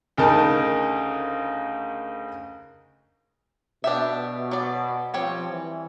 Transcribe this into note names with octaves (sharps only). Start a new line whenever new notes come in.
D2 C#3 D#4 A#4 A5
B2 D4 G4 E5
F#3 D5
F3 G3 C4 C#5
E3